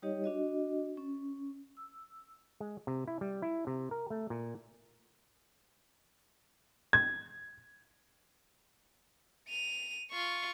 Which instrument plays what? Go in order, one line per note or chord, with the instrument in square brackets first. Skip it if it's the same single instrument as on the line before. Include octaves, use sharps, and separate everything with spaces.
[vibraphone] G3 D#4 G4 C#5 D#5
D4 F#4 D#5
C#4
E6
[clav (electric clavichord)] G#3
C3
E4
G3
E4
C3
A#4
A3
A#2
[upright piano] G#6
[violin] D#7 F7
F4 C#6